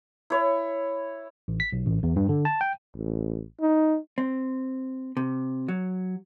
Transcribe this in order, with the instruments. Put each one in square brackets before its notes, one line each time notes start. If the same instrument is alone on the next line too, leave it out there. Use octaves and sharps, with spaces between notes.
[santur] E4 C#5
[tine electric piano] A1
B6
B1
A1
E2
G2
D3
A5
G5
[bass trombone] A1
D#4
[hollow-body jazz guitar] C4
C3
F#3